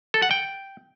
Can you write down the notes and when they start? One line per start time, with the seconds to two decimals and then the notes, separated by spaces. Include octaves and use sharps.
0.14 A4
0.22 F#5
0.31 G5